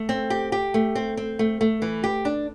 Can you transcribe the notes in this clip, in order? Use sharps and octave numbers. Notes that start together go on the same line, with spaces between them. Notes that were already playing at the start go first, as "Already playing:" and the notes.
Already playing: A3
C4
G4
G4
A3
C4
C4
A3
A3
E3
G4
D4